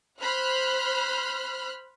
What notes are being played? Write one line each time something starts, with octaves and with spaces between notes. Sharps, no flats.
C5 B5 F6 F#6